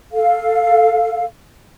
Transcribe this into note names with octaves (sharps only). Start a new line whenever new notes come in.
A4 F5